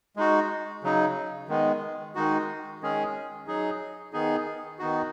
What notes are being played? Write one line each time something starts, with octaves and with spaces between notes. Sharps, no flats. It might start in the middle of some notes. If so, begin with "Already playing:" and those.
G#3 D#4 F#4
C#3 F#3 D#4
D#3 G#3 B3
D#3 G#3 D#4 F#4
D#3 G#3 C#4 G#4
F#3 D#4 G#4
D#3 B3 D#4 G#4
D#3 B3 D#4 F#4